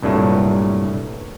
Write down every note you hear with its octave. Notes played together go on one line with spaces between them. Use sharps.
C2 G2 A#2 F#3 A3